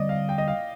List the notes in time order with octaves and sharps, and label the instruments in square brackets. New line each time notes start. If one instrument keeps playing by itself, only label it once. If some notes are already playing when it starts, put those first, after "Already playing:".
Already playing: [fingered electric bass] D3 G3 C4 [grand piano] D5 D#5
[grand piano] F5
G5
D#5
F5